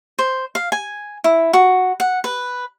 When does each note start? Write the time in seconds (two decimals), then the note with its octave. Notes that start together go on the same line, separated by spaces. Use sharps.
0.19 C5
0.55 F5
0.72 G#5
1.24 E4
1.53 F#4
2.00 F#5
2.24 B4